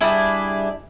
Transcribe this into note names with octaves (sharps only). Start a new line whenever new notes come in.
G3 D4 E4 G#4